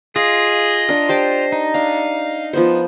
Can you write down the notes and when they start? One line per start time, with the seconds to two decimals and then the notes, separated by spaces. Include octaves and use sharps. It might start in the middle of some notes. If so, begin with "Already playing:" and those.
0.16 F4 G#4 D#5 F5
0.89 D4 A#4
1.09 G4 C5 G5 A5
1.52 D#4
1.74 D4 F5
2.53 F3 B3 C5